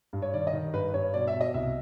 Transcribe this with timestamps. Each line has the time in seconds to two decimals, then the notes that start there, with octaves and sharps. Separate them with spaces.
0.13 G2
0.22 C#5
0.34 D#3 D5
0.47 D#5
0.53 D#3
0.73 G2 B4
0.94 G2 C#5
1.14 B2 D5
1.27 E5
1.34 B2
1.41 D#5
1.54 C2 E5